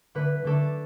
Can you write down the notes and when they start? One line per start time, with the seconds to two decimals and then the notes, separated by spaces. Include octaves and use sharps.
0.15 D3 A3 D4 B4
0.45 D3 A3 D4 A4